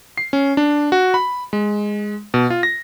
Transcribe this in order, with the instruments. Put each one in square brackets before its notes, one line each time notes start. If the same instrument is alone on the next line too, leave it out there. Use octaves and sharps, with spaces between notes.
[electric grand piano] C7
C#4
D4
F#4
B5
G#3
B2
F4
A#6